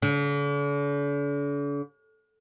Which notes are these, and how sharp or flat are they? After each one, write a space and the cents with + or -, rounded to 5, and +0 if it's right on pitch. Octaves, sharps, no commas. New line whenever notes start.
D3 -45